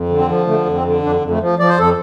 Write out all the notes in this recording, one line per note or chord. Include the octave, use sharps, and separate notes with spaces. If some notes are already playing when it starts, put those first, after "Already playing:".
Already playing: F2
D3
C4
F3
D3 A3
F2
C4
D3
F2 D4
F2
A3
F3
F3 D5
C5
F2 A4